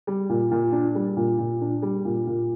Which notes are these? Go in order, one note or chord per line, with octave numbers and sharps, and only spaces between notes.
G3
A#2
A#2
D4
G3
A#2
A#2
D4
G3
A#2
A#2